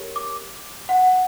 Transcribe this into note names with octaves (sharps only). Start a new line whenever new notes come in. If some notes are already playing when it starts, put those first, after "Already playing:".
Already playing: G4 A#4 C#5
D6
F#5